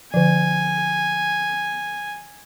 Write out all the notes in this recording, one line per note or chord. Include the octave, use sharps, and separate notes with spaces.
D3 F3 G#5